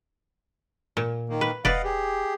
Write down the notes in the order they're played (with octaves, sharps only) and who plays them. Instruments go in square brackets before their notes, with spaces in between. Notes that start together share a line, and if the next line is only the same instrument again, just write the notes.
[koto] A#2
[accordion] D#3 A#3
[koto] B4
[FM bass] E1 [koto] B4 D5 [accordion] D#5 F5 F#5
[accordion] G4 G#4